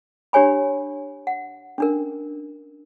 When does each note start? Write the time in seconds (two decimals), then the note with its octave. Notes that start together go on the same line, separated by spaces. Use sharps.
0.33 D4 G4 C#5 G#5 B5
1.27 F#5
1.78 C#4 D4 A#4